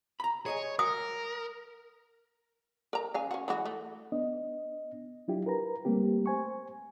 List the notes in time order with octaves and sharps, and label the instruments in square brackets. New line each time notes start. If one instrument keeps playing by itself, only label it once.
[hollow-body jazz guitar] A#5 B5
[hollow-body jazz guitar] G#4 D#5 G#5 [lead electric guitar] C#5
[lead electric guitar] A#4 [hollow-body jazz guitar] F#5 [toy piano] D#6
[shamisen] A#4 A#5
C#3 F5 G#5
C#4 F#4
E3 G#3 F#4
A3
[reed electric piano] B3 D4 D#5
F#3 D4 E4 F4 G4
A#4 B4 A#5
G3 A3 A#3 C4 G4
C5 G#5 C#6